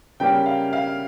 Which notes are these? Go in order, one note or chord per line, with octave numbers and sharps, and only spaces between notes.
C#3 G3 A#3 C#4 G5
F5
F5